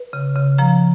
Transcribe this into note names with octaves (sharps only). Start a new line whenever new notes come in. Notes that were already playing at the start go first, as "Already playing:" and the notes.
Already playing: B4
C#3
C#3
F3 A#5